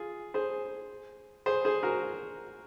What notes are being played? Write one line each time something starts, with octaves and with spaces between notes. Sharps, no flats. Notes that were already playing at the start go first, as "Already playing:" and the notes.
Already playing: F4 G#4
G#4 C5
G#4 C5
G#4 C5
F#4 A#4